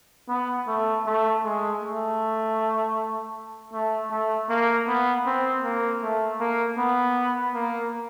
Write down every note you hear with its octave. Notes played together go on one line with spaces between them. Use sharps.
B3
A3
A3
G#3
A3
A3
A3
A#3
B3
C4
A#3
A3
A#3
B3
A#3